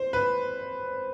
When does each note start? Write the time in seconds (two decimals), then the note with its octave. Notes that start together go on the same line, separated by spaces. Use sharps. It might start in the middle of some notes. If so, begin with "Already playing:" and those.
Already playing: C5
0.13 B4